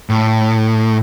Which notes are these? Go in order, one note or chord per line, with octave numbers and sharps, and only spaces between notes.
A2